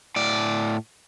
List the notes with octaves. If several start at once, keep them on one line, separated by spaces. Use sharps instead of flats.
A2 D5